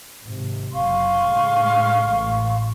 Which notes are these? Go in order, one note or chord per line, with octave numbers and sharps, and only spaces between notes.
G#1 C3
F#1 F5 C6 C#6
A2 C#3 G#3
A1